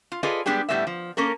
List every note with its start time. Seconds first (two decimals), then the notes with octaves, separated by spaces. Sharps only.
0.12 F4
0.23 F4 G#4 A4 B4 D5 D#5
0.46 G3 G#3 B3 D4 G4 G#4
0.69 A2 G3 G#3 B3 E5
0.87 F3
1.17 A#3 C#4 A4 A#4